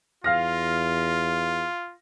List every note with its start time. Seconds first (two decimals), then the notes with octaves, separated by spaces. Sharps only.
0.24 E2 F4 F5 F6 A#6